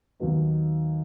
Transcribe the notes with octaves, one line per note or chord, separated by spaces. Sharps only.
D#2 D#3 F#3 B3 D#4